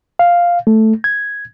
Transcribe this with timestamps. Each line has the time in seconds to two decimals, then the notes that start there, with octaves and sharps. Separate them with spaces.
0.19 F5
0.67 A3
1.04 G#6